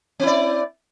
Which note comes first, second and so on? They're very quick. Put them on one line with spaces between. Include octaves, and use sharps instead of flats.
C4 E4 D5